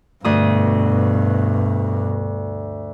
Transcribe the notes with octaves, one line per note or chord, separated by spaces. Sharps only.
D2 G2 B2 D#6